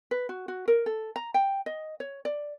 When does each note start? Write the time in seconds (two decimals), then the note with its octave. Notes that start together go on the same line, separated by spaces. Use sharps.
0.11 B4
0.29 F#4
0.48 F#4
0.68 A#4
0.86 A4
1.16 A#5
1.34 G5
1.66 D#5
2.00 C#5
2.25 D5